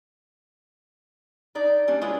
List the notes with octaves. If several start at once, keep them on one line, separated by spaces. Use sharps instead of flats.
D4 D#4 D5
G3 A#3 C#4 D4
G#3 C#4 E4 F4 B4 C#5